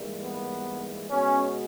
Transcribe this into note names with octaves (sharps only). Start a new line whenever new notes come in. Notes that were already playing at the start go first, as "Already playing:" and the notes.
Already playing: G#2 E3 G3 A#3
B3
B2 G#3 B3 C#4